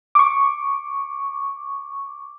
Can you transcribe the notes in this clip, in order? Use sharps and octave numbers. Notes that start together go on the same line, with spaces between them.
C#6 D6